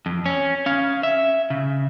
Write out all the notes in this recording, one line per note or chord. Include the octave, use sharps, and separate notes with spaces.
F2
C#4
C#4 F5
E5
C#3